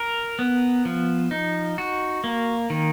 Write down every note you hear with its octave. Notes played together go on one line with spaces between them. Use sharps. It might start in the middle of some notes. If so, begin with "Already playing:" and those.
Already playing: A#4
B3
F3
D#4
F#4
A#3
D#3